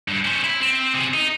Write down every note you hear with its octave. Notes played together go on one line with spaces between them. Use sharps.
G2
C#4 C5
E4
C4
C3 G#4
D#4